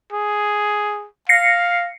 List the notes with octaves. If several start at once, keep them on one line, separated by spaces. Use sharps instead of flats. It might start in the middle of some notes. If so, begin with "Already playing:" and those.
G#4
F5 A#6 C7 C#7